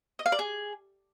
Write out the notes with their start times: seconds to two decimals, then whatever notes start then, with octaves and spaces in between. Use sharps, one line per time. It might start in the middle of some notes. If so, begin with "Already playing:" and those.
0.19 D#5
0.26 F5
0.32 D5
0.39 G#4